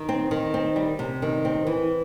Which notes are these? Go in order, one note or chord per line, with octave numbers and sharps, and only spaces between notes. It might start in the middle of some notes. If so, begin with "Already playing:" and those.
Already playing: D#3
C4
D#3
C4
G3
C3
D#3
C4
E3